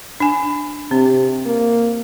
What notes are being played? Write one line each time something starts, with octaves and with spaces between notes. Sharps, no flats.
D4 G#5
C3 C4
A#3